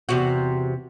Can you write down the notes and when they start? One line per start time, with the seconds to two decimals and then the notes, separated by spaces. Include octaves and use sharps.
0.09 E2 C3 F#4